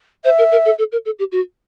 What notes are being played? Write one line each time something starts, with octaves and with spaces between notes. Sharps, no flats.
C5 E5
A#4
A#4
A4
A4
A#4
A4
G4
F#4